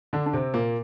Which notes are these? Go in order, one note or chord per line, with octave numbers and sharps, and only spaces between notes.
D3 D4
D4
C3 C4
A#2 A#3